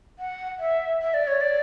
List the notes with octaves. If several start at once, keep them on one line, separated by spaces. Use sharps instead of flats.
F#5
E5
E5
D5
C#5
D5